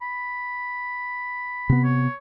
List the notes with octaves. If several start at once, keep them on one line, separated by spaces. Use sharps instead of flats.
B5
C3 B3
C#5